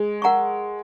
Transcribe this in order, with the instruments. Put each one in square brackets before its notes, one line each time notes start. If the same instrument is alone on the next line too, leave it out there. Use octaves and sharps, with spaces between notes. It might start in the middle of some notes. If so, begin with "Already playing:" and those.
Already playing: [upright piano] G#3
[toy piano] A#4 F#5 A#5 C#6